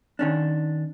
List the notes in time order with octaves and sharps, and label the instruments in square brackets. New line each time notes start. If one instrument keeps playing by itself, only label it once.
[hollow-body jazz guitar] D#3 C#4 D4